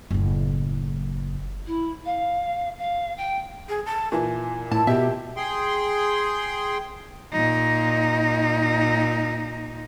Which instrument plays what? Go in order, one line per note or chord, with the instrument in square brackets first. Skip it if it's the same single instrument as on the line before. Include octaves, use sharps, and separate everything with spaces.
[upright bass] F#1 A2
[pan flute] E4
F5
F5
G5
[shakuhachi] G#4
A5
[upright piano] A#2 E3 [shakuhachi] G#5
[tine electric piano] A2 [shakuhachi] E4 [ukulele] A5
[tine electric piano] B2 [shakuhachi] G4 [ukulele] E5
[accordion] G#4 G5 C6
[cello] A#2 D#4